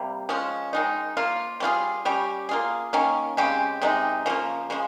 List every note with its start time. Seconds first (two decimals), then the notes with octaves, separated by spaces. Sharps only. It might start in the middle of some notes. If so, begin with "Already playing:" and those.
Already playing: C3 G3 A#3
0.29 F3 G#3 C#4
0.73 D#3 G#3 D#4
1.17 F3 A#3 F4
1.60 G3 C#4 F4 G#4
2.05 G3 C#4 G4
2.49 A#3 F4 G#4
2.93 D#3 A#3 C#4
3.37 C#3 G#3 C4 G4
3.82 C3 D#3 G#3 D#4
4.26 C#3 F3 A#3
4.70 C#3 F3 G#3